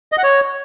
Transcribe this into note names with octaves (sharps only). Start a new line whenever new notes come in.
D#5
F#5
C#5